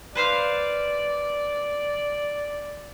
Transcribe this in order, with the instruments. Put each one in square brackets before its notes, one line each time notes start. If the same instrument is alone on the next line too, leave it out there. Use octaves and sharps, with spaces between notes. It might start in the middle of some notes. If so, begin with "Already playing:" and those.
[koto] B4 C5 F5 [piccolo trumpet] D5